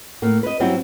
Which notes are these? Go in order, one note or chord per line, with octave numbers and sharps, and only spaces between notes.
A2 A#3
B4 D#5
G2 F#3 B3 C4 E4 F#4